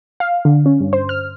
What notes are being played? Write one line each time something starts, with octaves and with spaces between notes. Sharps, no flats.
F5
D3
C#4
G2
C5
F6